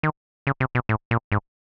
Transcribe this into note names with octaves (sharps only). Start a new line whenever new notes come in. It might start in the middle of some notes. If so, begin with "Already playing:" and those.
D#3
C#3
C3
B2
A2
A#2
G#2